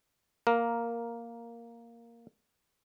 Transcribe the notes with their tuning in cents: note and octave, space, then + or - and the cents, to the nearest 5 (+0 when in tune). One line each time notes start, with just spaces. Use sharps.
A#3 +0 A#4 +5